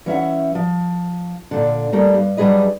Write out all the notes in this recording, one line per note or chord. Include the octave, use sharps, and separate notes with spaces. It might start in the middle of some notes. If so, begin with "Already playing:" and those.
E3 C#4 E5 F#5
F3
A#2 D3
G3 A3 A#3
G2
F#3 G3 D4 G#4 B4 D#5